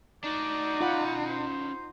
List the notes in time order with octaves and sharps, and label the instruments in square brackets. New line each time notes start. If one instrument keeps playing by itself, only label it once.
[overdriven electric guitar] D4 F#4 [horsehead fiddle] D#4 [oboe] D5
[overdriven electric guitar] C#4 B5 [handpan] F4 F#5
[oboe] C5